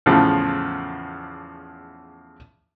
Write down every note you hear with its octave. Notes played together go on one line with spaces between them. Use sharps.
E2 A2 C#3 F3